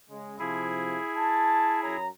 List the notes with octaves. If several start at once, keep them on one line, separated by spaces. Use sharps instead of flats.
C#3 G#3
C3 F3 E4 G#4
A5
F#2 C#5 A#5